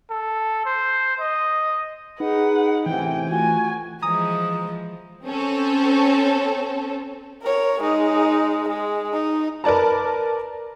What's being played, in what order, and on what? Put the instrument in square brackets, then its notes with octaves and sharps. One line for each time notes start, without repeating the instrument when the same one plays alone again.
[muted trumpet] A4
C5
D#5
[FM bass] D#4 [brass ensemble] G#4 B4 [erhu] F#5
[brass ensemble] A1 C3 G#5 [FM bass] E3 [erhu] G5
[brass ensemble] A3 F4 F#4 [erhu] G#5
[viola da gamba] E3 F3 G#3 [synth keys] A#5 D#6
[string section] C4 C#4 A4
[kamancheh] A#4 C#5
G#3 D#4
G#3
D#4
[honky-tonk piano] A#4 B4 D5 A5 A#5